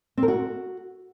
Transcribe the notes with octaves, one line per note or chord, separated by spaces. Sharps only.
C4
A#4
F#4